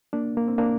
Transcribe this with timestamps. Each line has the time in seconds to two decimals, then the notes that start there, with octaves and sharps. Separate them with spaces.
0.13 A#3 D4
0.37 A#3
0.48 C4
0.58 A#3 D4